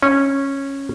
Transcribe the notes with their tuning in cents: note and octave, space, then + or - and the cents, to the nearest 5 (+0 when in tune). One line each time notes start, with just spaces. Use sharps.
C#4 -10